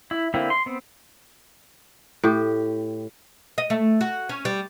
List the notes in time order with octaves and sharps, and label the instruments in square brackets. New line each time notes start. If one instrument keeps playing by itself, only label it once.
[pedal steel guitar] E4
D3 A#3 C4 E4
C6
B3 C4
[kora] A2 G4
[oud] D#5
A3
F#4
C#4
G3